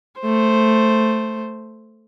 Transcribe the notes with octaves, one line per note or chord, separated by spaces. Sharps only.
A3 C5